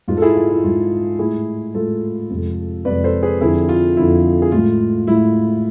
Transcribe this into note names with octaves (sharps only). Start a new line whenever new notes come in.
G#2 G#3 F4
A4
E4 G#4
F4
E4
G#2 G#3 F4
A2 G#3 E4 G#4
A2 G#3 F4 A4
F2 C3 G#3
F2 C3 G#3 B4 D5
A4 C5
G#4 B4
F2 D3 F3 E4 G#4
F4
F2 D3 F3 E4
G#4
A2 G#3 F4
A2 G#3 E4